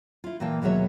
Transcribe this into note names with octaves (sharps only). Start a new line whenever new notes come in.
E4 F4
A#2 E3 A#3 G5 A5
D#2 B2 F#3 G#3 C#5 E5